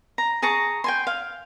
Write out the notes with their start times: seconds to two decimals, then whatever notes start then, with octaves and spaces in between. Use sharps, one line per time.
0.18 A#5
0.42 G#4 A5 A#5 C#6
0.84 G5 G#5 C6
1.07 F5